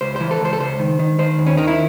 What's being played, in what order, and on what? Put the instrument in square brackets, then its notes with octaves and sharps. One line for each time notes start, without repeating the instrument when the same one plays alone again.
[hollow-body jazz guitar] C#2 C5
E3 C5
A4
C#2 C5
A4
C#2 C5
D#3
D#3
D#3 C5
D#2
C#4
D#3 D#4
E4